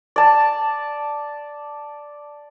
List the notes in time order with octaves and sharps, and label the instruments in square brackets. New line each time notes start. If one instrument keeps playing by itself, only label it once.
[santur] D5 A5